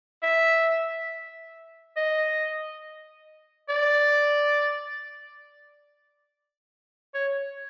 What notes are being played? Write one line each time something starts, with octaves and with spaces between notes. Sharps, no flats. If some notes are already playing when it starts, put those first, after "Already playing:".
E5
D#5
D5
C#5